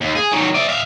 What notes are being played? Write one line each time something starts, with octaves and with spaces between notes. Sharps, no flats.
D#2
G#4
D#3 F#3
D5 E5
E5 F5